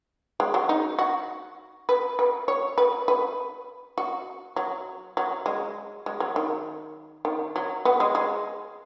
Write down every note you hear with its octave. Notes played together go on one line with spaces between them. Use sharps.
G#3
F#3
D#4
F#4
B4
B4
C#5
B4
B4
F#4
F#3
F#3
G#3
G#3
F#3
D#3
D#3
F#3
B3
G#3
G#3